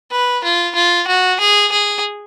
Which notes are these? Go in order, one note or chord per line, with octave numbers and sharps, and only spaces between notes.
B4
F4
F4
F#4
G#4
G#4